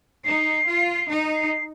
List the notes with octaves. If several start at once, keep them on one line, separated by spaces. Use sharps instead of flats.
D#4 C7
F4
D#4
C7